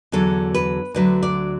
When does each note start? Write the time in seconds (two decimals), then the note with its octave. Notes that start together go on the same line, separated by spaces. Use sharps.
0.12 E2 D3 F#3 A4
0.54 B4
0.94 D2 D3 F#3 B4
1.23 D5